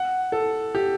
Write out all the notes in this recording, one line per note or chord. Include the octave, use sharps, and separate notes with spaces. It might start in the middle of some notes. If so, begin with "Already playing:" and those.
Already playing: F#5
A4
G4